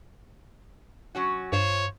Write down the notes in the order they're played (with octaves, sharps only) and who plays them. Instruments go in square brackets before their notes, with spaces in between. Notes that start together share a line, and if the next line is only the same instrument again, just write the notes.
[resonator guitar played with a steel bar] F#3 C#4 F#4
[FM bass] G2 [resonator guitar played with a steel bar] F4 C5 [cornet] C#5